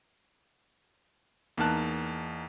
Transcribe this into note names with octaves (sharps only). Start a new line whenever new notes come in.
E2 A#3 D#4 A#4 A5 F#6